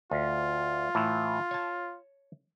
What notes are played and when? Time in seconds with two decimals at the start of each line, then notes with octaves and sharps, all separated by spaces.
0.11 D2 F4
0.95 A2 E3
1.51 C#5 A5